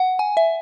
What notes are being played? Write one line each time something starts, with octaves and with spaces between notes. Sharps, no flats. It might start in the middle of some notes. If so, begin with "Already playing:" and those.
Already playing: F#5
G#5
E5